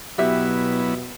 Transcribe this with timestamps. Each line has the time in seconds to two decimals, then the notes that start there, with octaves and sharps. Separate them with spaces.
0.18 B2 F#3 B3 E4 G4 E5